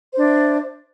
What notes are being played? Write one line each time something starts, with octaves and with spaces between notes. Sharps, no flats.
D4 C5 E5